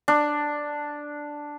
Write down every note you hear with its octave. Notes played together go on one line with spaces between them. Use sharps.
D4